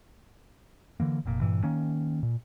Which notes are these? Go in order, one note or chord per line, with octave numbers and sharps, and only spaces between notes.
D3 E3 A#3
F1 A#2
G2 A#2 E3
D#3 A#3 C#4
A#2